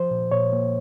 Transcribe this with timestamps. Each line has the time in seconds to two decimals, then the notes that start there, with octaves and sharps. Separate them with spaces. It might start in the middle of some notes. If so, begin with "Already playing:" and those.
Already playing: F3 C5
0.11 A#2
0.32 A#2 C#5
0.52 A#3